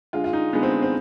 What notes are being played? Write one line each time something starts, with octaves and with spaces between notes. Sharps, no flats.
D3 G#3 F4
F4
D#4
D3 G#3 B3
C4
C4